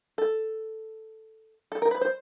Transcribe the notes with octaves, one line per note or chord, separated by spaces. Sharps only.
A4
A4
A#4
B4
C5